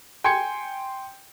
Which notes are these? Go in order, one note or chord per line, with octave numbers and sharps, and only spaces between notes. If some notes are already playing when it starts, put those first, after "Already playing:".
G5 G#5 C6 G6 G#6 C#7